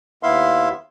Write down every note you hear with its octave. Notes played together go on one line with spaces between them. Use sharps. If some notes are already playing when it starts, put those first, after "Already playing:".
D#2 B3 E4 E5 F5 C6